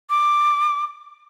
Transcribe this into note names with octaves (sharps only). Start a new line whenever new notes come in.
D6